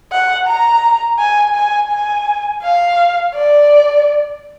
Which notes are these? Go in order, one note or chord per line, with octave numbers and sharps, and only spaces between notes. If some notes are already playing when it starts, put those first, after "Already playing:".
F#5
A#5
G#5
G#5
G#5
F5
D5